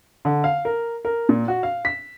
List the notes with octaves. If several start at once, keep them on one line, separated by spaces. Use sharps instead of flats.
D3
F5
A#4
A#4
A#2
F#4
F5
B6